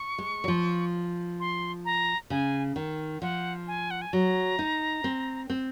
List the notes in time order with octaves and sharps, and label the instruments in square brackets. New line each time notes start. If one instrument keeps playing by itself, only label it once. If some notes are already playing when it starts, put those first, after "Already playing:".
Already playing: [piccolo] C#6
[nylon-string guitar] G#3
F#3
F3
[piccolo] C6
A#5
[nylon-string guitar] C#3 [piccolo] G#5
[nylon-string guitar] D#3
[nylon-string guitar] F3 [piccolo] F#5
[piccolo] G#5
F#5
G#5
[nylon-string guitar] F#3 [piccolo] A#5
[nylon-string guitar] D#4
C4
C4